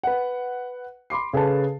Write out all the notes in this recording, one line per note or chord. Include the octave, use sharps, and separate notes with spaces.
B4 F#5
B5 C6 D6 C7
C#3 G#4 A4 B4 A5